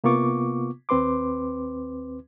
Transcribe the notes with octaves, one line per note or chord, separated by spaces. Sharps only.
C3 A#3 B3 F4 C#6 D6
D#2 C4 B4 C6 D6